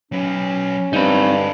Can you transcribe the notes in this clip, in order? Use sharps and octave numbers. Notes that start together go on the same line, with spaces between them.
F#3 C#4 B4
G2 D3 C4 D#4 B5